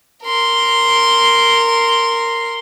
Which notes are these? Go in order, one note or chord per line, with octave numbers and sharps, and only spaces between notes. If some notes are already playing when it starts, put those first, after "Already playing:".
A#4 C6